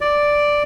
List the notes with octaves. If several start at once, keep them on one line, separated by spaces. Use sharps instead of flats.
D5